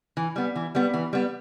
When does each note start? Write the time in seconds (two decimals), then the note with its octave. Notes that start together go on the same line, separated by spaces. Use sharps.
0.17 E3
0.36 G3 B3
0.56 E3
0.75 G3 B3
0.94 E3
1.13 G3 B3